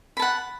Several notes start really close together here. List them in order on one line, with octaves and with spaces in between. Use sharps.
B5 A5 F#5